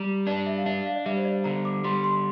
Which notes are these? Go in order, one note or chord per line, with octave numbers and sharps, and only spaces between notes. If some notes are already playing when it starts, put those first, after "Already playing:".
Already playing: G3 A#5
D4 D5
E5
F5
D4 E5
F5
D5
G3 E5
C5
D5
D3 A#5
D6
G3 C6
C6